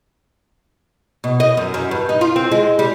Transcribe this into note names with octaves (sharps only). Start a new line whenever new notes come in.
B2
D#5
F#2
F#2
G2
D#4
F4
C4
G#3
G3